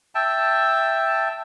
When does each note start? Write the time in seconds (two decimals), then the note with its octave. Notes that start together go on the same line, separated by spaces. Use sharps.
0.15 E5 G5 A5